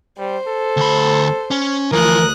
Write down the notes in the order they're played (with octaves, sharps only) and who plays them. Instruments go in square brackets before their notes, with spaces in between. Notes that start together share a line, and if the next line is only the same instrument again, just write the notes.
[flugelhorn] G3 [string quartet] C5
[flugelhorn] A4
[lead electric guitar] D2 B5
C#4
[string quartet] D2 D#6 F#6 [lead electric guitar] E3 F3 [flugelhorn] A#4